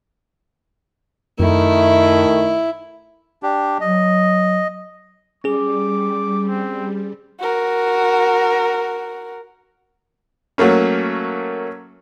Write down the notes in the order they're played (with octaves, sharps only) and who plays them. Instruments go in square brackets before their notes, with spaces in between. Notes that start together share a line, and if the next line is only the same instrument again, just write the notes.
[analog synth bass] F#2 [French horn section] D#3 A3 [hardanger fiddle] E4
[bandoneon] D4 G4
[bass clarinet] F#3 [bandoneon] D#5
[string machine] G3 [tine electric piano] C#4 G#4 [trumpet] D6
[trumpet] C4
[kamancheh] F#4 A#4
[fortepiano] F#3 A3 A#3 C#4